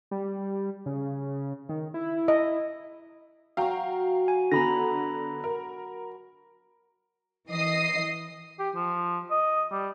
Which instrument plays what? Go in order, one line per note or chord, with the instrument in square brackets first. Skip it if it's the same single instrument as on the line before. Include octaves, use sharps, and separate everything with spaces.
[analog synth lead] G3
C#3
D#3
E4
[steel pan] D#5
[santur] F#3 C#6 [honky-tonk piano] F5 G5 A#5
[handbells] G#5
[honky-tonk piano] D3 B3 [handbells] A#5 B5 A#6
[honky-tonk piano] A#4
[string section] E3 D#5 D#6 C7
[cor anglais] G4
F3
D#5
G3